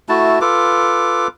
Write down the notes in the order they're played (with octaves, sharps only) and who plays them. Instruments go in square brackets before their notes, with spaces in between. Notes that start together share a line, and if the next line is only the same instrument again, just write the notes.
[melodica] A3 E4 F#4 A5
F4 A4 B4 D6